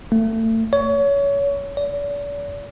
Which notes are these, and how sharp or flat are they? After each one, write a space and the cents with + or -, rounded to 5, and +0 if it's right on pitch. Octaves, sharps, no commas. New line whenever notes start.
A3 +30
C#5 +25
D5 -40